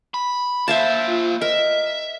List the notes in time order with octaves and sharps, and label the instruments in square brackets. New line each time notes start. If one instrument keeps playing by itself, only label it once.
[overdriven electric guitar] B5
[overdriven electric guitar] A#3 C5 [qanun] E5 F5 A5
[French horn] F4
[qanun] A#4 [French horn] D#5 [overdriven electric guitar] E5